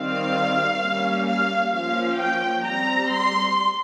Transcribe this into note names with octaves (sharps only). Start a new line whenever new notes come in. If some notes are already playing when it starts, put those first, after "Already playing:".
Already playing: D#3 G3 C4 F5
G3 A#3 C#4
F5
F3 A#3 C#4 F5
G5
G3 C4 A#5
C6